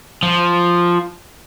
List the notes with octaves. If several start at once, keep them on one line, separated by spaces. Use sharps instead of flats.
F3